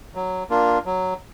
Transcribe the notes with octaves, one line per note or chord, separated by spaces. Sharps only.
F#3
A#3 D4 F4
F#3